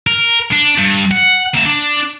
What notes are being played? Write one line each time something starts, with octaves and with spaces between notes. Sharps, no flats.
A#4
D4
G2
F#5
A#3 E5
D4